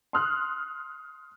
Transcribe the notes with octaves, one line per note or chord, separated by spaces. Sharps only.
C6 D#6 F6 F#6